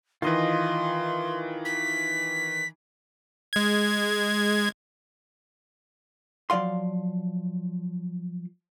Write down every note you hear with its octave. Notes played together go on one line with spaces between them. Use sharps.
D#3 E3 F4 D#5 C6
B6
G#3 G#6
F3 F#3 D5 F5 C6